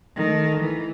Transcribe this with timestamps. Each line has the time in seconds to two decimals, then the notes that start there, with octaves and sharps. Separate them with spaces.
0.16 D#3 A3
0.61 E3